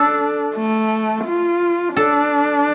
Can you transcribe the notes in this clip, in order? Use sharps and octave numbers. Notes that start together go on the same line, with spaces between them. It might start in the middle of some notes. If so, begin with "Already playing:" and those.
Already playing: D4 A4
A3
F4
D4 A4